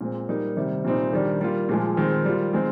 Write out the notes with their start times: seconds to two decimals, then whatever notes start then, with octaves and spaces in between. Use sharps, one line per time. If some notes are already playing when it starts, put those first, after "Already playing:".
0.01 A#2 G#3 C4
0.29 G3 A#3 D#4
0.57 C3 D#3 G3
0.85 A#2 G3 C4 D#4
1.13 D#3 G3 D4
1.41 G3 A#3 F4
1.69 A#2 F3 G#3
1.97 D#3 G#3 C4
2.25 G3 A#3 F4
2.53 D#3 G#3 C4